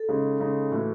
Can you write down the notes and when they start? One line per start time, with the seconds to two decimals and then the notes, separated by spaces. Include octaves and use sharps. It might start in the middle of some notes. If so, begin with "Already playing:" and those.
Already playing: A4
0.09 C#3 G#3 D#4
0.40 C#3 G#3 D#4
0.71 A2 E3 A3 F#4